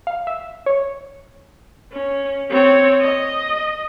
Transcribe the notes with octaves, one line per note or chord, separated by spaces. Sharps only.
F5
E5
C#5
C#4
C4 C#5
D#5